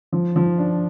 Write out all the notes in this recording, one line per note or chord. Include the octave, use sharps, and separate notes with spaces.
F3
F3
D4